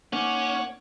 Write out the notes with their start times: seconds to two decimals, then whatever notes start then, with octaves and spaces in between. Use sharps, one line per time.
0.13 A#3 C#4 D#4 C#5 F#5 C#6 D6